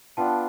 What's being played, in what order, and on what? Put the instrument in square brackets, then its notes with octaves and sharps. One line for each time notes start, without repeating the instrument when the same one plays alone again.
[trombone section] B3 D4 F4 [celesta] G5 A5